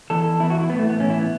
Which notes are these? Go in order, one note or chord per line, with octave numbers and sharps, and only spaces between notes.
E2 E3 A4
E2 E3 E4
F#4
E4
A2 E3 B3
A3
B3
A2 E3 C#4
E4
B3